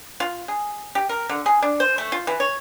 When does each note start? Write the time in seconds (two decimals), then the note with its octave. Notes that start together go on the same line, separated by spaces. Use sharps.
0.20 F4
0.48 G#4
0.95 G4
1.09 A#4
1.29 D3
1.46 G#4
1.62 D4
1.80 C5
1.98 A3
2.12 F4
2.27 E3
2.40 C#5